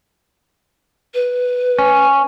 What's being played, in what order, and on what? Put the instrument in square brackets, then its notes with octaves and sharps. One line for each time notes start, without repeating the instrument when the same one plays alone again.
[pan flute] B4
[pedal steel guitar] C#4